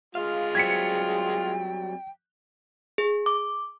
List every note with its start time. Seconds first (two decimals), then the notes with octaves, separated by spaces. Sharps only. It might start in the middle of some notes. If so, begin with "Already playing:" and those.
0.15 G#3 F4 F5
0.55 F#3 G3 C4 G5 G#6 B6 C#7
2.98 G#4
3.26 D6